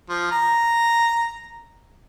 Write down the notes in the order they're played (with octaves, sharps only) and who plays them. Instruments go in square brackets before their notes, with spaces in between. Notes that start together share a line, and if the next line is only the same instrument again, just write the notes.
[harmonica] F3
A#5